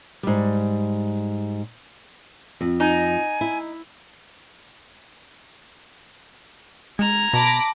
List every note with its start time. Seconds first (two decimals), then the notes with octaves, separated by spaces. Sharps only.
0.23 G#2 G3
2.61 F2
2.80 D#4 G#5
3.41 E4
6.99 G#3 A#5 G#6
7.33 B2 A5 B5 D6 A#6